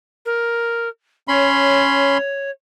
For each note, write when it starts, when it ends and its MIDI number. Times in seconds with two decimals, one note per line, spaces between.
0.25 0.88 70
1.28 2.18 61
1.28 2.50 73
1.28 2.18 83
1.28 2.18 84